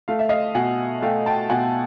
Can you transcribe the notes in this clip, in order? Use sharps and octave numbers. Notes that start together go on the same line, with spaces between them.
A3 F5
E5
D#5 F5
B2 F#5 G#5
A3 F5 G5
G5 A5
B2 F#5 G#5